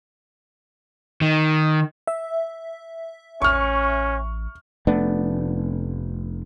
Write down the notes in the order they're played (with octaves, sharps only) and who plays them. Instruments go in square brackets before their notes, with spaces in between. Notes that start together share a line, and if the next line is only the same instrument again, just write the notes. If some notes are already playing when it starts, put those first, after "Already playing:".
[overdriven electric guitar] D#3
[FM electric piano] E5
[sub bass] A1 [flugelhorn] C#4 [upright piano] C#6 F6
[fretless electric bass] F1 A3 B3 D4